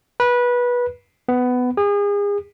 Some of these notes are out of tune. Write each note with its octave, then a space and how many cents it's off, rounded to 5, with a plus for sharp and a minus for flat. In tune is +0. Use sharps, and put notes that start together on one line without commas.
B4 -20
B3 +15
G#4 -35